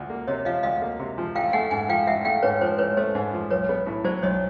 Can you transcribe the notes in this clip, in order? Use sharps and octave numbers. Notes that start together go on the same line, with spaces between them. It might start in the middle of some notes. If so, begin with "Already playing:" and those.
Already playing: D2 F3
A#3
C3 C#5 D#5
F3 D#5 F5
D2 D#5 F5
A#3
C3
F3
A1 F5 G5
A3 F#5 G#5
G#2 F#5 G#5
F3 F5 G5
A1 E5 F#5
A3 F5 G5
G#2 B4 C#5
F3 C5
A1 B4 C#5
A3 C5
G#2
F3
B1 B4 C#5
B3
A2
F#3 C5 D5
B1 C#5 D#5